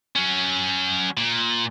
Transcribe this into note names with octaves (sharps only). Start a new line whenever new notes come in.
F#3 C#4
A#2